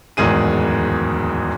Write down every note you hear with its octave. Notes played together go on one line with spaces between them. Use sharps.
D1 E2 G#2 D#3 G#4 D#7